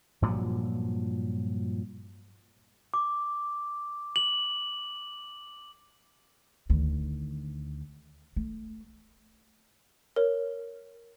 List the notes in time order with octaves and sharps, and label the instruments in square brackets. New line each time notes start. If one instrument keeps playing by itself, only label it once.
[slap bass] G2 A#2 F3 F#3
[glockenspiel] D6
F#7
[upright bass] D2 D#3
A3
[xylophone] A#4 C#5